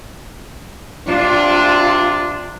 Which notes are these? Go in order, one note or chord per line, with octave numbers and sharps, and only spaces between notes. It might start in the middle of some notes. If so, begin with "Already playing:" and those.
C3 D4 F4